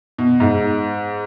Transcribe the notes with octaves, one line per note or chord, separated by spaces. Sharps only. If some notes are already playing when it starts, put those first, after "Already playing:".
B2
G#2